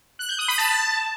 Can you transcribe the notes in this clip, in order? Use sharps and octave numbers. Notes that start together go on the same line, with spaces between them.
F#6
G6
D#6
B5
A5